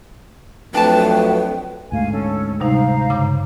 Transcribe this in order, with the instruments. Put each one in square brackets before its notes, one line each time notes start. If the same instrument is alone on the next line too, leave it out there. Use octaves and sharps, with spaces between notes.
[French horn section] F2 F#3 A3 [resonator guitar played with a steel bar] D4 A5 [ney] B4 [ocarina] G5
[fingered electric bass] D2 G#2 A3 [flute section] F5 G#5
[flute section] C#4 A4
[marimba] C3 G3 D#4 [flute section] C5 F5 A#5
[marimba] G2 C#3 D6